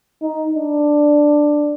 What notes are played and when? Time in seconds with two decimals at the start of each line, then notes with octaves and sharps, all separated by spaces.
0.22 D#4
0.56 D4